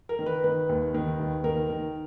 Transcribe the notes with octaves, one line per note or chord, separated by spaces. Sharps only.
A#4
D#3
B4
D#3 B4
D#2
D#3
D#2
D#3 A#4
D#3